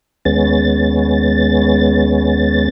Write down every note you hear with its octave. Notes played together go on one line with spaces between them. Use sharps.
D#2 G#3 B3 C#4 A6